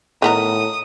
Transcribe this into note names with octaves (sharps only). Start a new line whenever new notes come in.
A2 D#3 B3 A#4 D#6